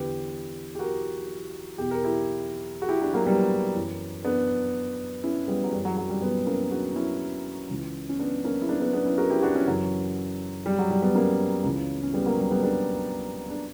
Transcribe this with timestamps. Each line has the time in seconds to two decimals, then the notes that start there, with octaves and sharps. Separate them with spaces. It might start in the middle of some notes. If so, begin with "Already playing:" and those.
Already playing: E2 D3 G4 B4
0.75 G4
0.79 F#4 A#4
1.78 E2 B2 G4
1.91 A#4
2.04 E4 G4
2.82 F#4
2.89 E4 G4
3.02 D4 F#4
3.13 F#3 A#3
3.26 G3 B3
3.75 F#2 E3
4.24 B3 D4
5.24 C#4 E4
5.48 G3 B3
5.64 F#3
5.73 F#2 E3 G3
5.85 F#3
5.97 F#3
6.09 G3
6.22 G3 B3
6.46 A#3 C#4
6.71 D4 F#4
6.96 C#4 E4
7.69 C#2 C#3 E3
8.09 C#4
8.19 B3 D4
8.44 A#3 C#4
8.62 E4
8.68 B3 D4
8.81 B3 D4
8.93 B3 D4
9.06 C#4 E4
9.18 F#4 A#4
9.30 E4 G4
9.42 D4 F#4
9.55 C#4 E4
9.67 F#2 C#3 E3 F#3
10.66 G3
10.79 F#3
10.91 G3
11.02 G3 B3
11.15 A#3 C#4
11.64 C#2 C#3 E3
12.03 C#4
12.14 G3 B3
12.26 F#3 A#3
12.38 G3
12.51 G3 B3
12.63 B3 D4
13.50 D4